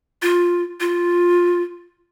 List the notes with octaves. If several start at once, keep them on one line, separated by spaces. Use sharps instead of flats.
F4
F4